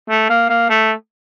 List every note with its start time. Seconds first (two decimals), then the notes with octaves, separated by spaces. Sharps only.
0.09 A3
0.30 A#3
0.49 A#3
0.69 A3